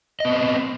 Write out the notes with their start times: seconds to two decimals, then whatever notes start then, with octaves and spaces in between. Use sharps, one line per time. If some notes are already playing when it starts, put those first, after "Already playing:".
0.20 D#5
0.25 B3
0.29 C4